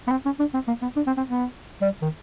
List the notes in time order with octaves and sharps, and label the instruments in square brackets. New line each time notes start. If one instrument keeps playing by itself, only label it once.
[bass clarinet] B3
C4
C#4
D4
C4
A#3
B3
D4
C4
C4
B3
G3
D#3